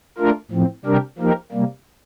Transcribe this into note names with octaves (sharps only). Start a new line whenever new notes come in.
A3 D4 F4 A#4
A2 F3 C4
C3 G3 D4 G4 A#4
F3 A#3 D#4 G4 A#4
C3 G3 A#3